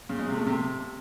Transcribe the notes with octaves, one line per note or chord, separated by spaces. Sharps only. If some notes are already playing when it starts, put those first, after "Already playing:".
C#3
G#3
C3
A3
C3